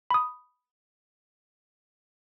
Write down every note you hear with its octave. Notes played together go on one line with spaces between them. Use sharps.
B5 D#6